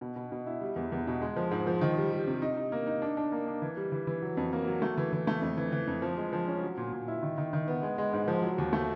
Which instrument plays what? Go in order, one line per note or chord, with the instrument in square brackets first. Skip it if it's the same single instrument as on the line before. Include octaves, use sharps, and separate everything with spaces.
[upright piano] B2
B2
B2
E4
G3
E2
E2
B2
G#3
F3
G#2
F3
D#3
G3
G3
C3
D#4
D#4
A#3
D#4
D4
D4
A#3
D4
E3
G3
E3
E3
F#3
F2
A#3
F#3
A3
E3
E3
A3
F2
E3
E3
F2
F3
G#3
F3
C#4
F#3
A#2
A#2
E4
D#3
D#3
D#3
B3
G#3
G#3
G#2
F3
F#3
D#2
A3